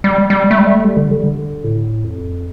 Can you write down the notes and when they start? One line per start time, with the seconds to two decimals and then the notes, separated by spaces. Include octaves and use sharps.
0.04 G3
0.30 G3
0.51 A3
0.58 G3
0.67 A3
0.84 G3
0.97 D3
1.11 G3
1.24 D3
1.64 A2
2.04 F2